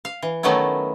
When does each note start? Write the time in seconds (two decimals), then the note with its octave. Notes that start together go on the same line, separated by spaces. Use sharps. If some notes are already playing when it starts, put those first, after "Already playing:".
0.05 F5
0.23 E3
0.43 D#3 F#3 A3 B3 C#4 E4